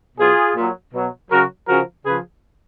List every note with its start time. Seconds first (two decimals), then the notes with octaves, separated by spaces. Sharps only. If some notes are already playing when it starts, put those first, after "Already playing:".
0.18 B2 F#3 F4 G#4
0.55 A#2
0.61 F#3
0.93 B2 F#3
1.31 C#3 F#3 F#4 A#4
1.68 C#3 F3 F#4 A#4
2.05 C#3 F3 G#4 B4